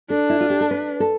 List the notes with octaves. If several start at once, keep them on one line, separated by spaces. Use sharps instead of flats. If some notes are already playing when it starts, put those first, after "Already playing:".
D4 A4
E4
F4
G4
A4
B4
A4